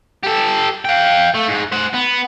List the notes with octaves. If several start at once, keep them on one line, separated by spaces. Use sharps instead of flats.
G4 A4
F5 G5
A3
G#2
C5 F#5
B3